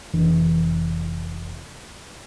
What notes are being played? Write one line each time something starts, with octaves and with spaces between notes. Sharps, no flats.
F1 E3 D4